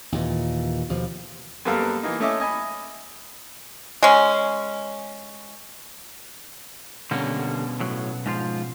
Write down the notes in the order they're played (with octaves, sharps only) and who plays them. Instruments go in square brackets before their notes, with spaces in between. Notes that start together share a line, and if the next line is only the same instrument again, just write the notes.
[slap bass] D#2 A#2 E3
D#2 B2 F3
[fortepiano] F#2 G3 A#3 B3 A4 F5
E3 A#3 D#4
A3 C#4 E4 D#5 E5 D6
D#5 G#5 B5
[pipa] G#3 C#4
[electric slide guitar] B2 B3 C#4 [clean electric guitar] D3 G3 A#3
[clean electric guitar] A2 F#3
G#2 F3 F4